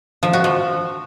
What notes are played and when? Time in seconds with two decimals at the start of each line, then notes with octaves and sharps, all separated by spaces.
0.23 F3
0.33 F#4
0.44 F3